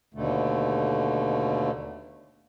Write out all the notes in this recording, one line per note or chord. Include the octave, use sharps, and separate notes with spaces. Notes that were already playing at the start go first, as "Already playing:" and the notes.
D#2 B2 D3 A3